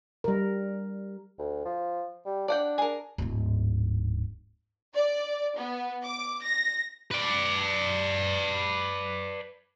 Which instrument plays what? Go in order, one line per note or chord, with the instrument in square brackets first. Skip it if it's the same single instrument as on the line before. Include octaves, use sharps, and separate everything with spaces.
[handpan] G3 A#4
[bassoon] D2
F3
G3
[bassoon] D4 [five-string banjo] D5 F#5 G5
[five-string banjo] G#4 A#4
[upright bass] D1 G#2
[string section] D5
B3
D6
A#6
[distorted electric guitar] B4 D5